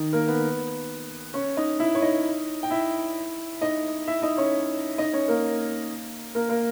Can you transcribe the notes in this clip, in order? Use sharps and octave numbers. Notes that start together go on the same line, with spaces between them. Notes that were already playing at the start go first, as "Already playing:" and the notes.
Already playing: D#3 D#4
A#3 A#4
B3 B4
C#4 C#5
D#4 D#5
E4 E5
C#5
D#4 D#5
G5
E4 E5
D#4 D#5
E4 E5
D#4 D#5
C#4 C#5
D#4 D#5
C#4 C#5
A#3 A#4
A#3 A#4
A#3 A#4